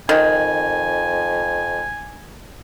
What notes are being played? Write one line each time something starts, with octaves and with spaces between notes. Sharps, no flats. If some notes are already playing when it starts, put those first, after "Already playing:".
F2 D#3 G#5